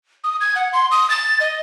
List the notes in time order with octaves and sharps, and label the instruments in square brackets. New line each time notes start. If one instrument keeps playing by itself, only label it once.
[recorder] D#6
G#6
F#5
C6
D#6
A6
D#5